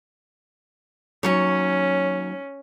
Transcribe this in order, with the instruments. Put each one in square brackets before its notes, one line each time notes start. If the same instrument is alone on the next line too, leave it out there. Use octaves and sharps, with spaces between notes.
[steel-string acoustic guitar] D#2 F#3 C#5 [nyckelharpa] C#4